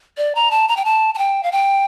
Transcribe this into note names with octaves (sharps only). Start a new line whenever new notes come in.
D5
A#5
A5
A#5
G5
A5
A5
G5
F5
G5